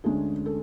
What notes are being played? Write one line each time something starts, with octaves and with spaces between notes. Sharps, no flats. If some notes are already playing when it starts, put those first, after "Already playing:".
D2 D3 G#3 C#4 G#4
A4